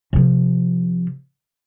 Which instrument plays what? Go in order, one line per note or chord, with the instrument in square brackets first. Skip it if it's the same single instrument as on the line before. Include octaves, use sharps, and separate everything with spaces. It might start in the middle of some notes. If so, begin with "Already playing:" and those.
[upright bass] C3 F3